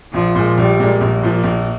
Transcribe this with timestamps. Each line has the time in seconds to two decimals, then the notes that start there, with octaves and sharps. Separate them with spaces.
0.14 A#1 F3
0.35 A#2 G#3
0.58 A#1 G3
0.80 A#2 G#3
1.01 A#1 A#3
1.23 A#2 F3
1.44 A#1